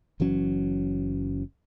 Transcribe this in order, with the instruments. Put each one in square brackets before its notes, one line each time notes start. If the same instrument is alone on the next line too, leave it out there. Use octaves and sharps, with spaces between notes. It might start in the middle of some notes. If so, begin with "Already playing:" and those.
[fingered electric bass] F#1 E3 F#3 C#4